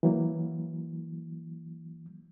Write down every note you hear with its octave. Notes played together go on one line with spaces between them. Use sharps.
E3 F#3 A#3